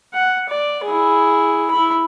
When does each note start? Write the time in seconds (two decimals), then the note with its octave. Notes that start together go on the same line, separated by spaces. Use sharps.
0.14 F#5
0.49 D5
0.84 E4 G#4
1.71 E4 B5